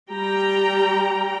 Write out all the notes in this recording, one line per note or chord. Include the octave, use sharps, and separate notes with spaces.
G3 G5 A#5